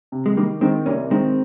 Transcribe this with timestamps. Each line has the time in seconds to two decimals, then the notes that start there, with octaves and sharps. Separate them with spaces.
0.12 C3
0.26 G#3
0.37 D#3 G3 A#3
0.61 D#3 G#3 C4
0.86 C2 A#3 C#4
1.11 D#3 G#3 C4